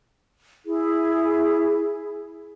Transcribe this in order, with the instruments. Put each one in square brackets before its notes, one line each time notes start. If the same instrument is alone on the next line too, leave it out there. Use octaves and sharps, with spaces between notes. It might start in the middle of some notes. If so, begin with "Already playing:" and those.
[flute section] E4 G#4